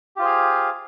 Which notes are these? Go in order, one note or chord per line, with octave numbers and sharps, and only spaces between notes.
F4 G4 G#4 C5 F5